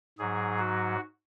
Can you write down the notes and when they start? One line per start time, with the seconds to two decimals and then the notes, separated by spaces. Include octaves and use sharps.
0.19 G#2 F#3 G#4
0.59 F#4